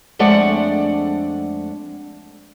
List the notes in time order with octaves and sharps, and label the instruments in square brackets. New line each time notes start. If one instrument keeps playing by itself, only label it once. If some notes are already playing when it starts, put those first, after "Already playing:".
[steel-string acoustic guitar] F2 G#3 A3 D4 D5 F#5